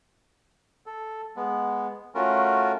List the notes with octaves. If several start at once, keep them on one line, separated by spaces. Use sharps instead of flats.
A4
G#3 B3
A3 C#4 F4 F#4 A#4